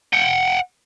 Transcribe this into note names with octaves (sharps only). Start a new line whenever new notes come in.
F#5 G5